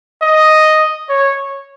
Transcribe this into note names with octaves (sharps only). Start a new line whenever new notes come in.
D#5
C#5